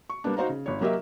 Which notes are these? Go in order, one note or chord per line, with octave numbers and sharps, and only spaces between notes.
C#6
G3 A#3 B3 D4
D#4 F#4 C5 F5 A#5
C#3
G1 C#5
F#3 A#3 G4 A#4 D#5 E5